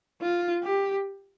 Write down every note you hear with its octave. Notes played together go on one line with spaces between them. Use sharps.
F4
G4